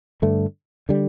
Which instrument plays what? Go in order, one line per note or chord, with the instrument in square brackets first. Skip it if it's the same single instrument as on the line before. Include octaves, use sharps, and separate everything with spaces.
[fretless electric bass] G2 D3 A3
D3 G3